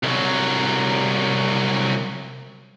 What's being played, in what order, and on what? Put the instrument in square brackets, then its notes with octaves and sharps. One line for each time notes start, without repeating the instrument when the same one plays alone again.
[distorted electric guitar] C2 F#3